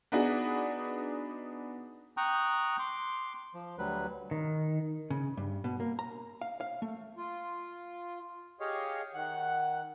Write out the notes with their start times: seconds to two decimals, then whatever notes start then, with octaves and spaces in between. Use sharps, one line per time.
0.12 B3 D4 D#4 F#4 G#4
2.17 G5 A#5 C#6 D#6 F#6
2.79 C6 D6
3.54 F3
3.78 D2 F#3 G3 B4
4.31 D#3
5.10 C#3
5.37 G2
5.64 B2
5.80 A#3
5.99 A#5
6.42 F5
6.61 F5
6.82 A3
7.17 F4
8.60 G4 G#4 C#5 D#5 F5
9.14 D#3 F#5